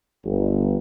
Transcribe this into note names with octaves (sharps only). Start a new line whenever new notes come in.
G1